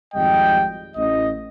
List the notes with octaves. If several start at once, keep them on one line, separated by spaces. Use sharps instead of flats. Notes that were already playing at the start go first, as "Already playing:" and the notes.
G#1 F2 G3 D#5 G5
A1 D#5